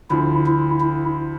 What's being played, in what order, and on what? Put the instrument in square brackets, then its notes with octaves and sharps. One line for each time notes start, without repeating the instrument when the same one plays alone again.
[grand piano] D2 D3 F3 [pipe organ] E4
[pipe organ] E4
E4